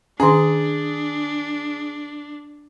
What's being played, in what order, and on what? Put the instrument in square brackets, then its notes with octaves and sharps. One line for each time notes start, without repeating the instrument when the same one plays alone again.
[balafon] D#3 C#4 [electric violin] D4 [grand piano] G#4